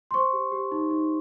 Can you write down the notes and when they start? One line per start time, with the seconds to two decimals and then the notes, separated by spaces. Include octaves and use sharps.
0.11 C6
0.14 C5 C#6
0.33 G4
0.52 G4
0.72 D#4
0.91 D#4